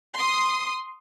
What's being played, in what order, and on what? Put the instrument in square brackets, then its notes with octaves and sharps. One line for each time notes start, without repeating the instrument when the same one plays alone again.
[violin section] C6 D#6